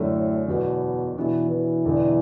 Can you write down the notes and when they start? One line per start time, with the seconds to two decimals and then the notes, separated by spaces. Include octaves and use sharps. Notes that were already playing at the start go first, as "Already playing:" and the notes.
Already playing: F#2 A2 D3 A3
0.48 E2 B2 D3 F#3
1.16 B2 E3 B3 D4
1.50 E3
1.85 E1 E2 D3